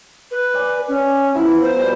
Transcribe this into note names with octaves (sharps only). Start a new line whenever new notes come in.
B4
D5 G#5
C#4
F3 B3 E4 E5
C5 A#5
B2 G3